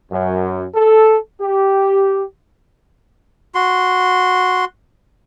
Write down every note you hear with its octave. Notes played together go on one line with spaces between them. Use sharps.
F#2
A4
G4
F#4 C6